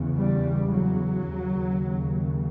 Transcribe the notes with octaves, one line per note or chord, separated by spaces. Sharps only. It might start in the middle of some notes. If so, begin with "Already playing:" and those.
Already playing: E2 C#3
G3
F#3
D#2 C#3